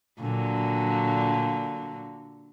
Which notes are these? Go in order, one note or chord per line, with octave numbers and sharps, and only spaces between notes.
A#2 D3 F#3